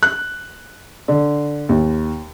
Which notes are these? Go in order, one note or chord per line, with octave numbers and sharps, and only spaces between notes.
F#6
D3
D#2